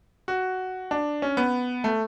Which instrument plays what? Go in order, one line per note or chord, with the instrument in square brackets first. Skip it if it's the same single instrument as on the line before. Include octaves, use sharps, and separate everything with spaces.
[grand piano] F#4
D4
C#4
B3
A3